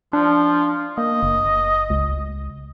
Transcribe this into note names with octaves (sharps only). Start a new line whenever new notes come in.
F3 D4
A#3 D#5
F#1
C#2